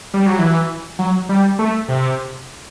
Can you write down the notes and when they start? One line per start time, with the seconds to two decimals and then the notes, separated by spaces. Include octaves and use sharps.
0.14 G3
0.26 F#3
0.39 E3
0.99 F#3
1.29 G3
1.59 A3
1.89 C3